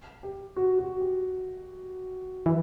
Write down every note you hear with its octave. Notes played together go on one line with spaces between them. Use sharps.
G4
F#4
F#4
G4
E3